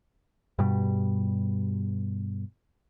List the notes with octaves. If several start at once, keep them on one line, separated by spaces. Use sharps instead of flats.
G2 B2 G3